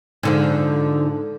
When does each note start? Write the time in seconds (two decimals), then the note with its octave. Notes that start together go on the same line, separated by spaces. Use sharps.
0.23 G#2 D3 F3